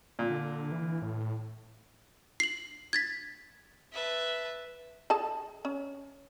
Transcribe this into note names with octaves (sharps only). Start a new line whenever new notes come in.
A#2
D3
E3
A2
C7 F#7
G#6 A6 B6
B4 E5 A5
G#4 A4 A5
C#4